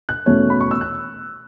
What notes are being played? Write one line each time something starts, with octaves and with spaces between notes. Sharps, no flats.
F#6
E2 B2 A3 C#4
B5
C#6
E6
F#6